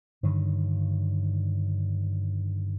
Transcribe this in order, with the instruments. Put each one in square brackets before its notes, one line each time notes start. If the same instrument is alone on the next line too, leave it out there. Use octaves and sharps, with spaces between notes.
[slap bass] G2 D3 D#3 F#3